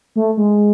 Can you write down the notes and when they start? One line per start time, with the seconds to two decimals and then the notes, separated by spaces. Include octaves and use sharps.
0.16 A3
0.37 G#3